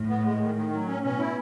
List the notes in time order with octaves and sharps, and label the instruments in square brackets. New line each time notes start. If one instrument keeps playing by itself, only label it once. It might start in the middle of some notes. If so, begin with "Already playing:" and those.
Already playing: [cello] A2
[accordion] B3
G#3
D#3
D#3
F#3
C#4
[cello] B2 [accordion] C#4
[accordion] E4